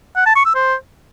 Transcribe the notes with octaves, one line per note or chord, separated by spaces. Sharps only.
F#5
A5
C#6
E6
C5